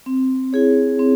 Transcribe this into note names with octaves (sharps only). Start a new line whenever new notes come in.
C4
E4 G#4 C#5
C4